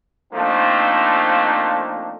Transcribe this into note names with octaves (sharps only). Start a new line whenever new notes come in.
F3 A3 A#3 C4 D4 D#4